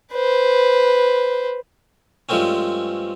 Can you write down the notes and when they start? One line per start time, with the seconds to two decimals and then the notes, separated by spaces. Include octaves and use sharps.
0.14 B4 C5
2.29 G2 F3 G#3 A3 C4 C#4